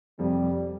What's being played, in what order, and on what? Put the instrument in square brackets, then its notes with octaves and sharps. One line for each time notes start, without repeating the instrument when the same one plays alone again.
[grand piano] F2 C3 F3 C4 [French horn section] G3